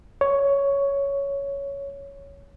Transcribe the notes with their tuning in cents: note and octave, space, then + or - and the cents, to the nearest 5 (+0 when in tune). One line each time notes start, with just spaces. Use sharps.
C#5 +10